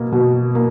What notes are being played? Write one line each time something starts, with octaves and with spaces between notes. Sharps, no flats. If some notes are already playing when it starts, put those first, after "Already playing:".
Already playing: B2 A#3
B2
A#3